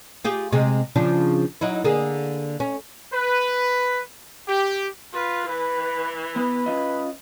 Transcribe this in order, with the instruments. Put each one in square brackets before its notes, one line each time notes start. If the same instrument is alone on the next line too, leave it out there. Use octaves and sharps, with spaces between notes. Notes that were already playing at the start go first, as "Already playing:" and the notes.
[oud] F4 G4 G#4
C3 G#3
C#3 F3 D4
F#3 D#4 E4
D3 A#3 G#4
C#4
[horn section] B4
G4
[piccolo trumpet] F4 [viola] B4
[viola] E3 [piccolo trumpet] B4
[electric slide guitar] B3 [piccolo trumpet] B4
[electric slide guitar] C#4 F4 D#5